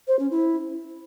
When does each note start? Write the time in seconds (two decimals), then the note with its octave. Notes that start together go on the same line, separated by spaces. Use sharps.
0.07 C5
0.19 C#4
0.31 E4